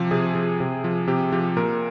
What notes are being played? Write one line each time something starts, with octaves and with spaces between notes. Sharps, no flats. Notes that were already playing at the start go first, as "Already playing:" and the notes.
Already playing: C3 F3 G4
C3 G#4
F3
C3
F3
C3 G4
F3 G4
A#2 A#4